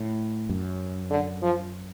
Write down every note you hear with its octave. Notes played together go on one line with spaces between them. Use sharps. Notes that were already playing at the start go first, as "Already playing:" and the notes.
Already playing: A2
F#2
D3
F3